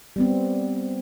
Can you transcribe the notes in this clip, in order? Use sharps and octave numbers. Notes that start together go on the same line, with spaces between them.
G3 B3 C4